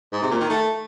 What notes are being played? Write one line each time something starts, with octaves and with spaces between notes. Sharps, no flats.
G#2
C3
A#2
D#3
A3